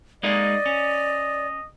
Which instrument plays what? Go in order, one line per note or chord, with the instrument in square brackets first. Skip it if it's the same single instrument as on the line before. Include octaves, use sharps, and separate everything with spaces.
[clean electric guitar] G#3 A#3 D#4 [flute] D5 [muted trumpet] D#5
[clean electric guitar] C#4